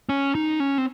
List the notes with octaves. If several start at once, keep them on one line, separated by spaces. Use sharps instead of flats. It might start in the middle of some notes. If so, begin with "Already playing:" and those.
C#4
D#4
C#4
C4